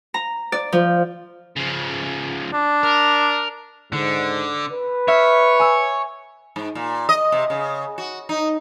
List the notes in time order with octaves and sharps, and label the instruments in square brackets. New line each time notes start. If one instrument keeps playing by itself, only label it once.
[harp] A#5
D5
F3
[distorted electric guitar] C#3 F3
[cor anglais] D4
[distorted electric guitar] A#4
[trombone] G#2 [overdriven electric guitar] D3
[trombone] B4
[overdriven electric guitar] C#5 [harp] E5 F6
[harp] G#5 E6
[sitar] G#2
A#2
D#5
C3
C#3
F#4
D#4